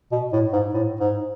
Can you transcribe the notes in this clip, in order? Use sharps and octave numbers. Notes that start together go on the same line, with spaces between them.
B2
A2
G#2
A2
G#2